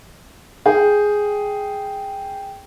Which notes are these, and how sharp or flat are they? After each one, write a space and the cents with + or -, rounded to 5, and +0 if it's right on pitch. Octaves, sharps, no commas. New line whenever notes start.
G#4 +0 G5 +0